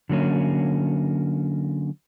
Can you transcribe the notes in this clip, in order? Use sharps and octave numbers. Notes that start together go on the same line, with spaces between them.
D3 F#3 A#3 C#4